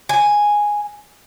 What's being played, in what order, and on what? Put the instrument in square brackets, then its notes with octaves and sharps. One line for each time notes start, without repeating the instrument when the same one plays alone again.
[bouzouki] G#5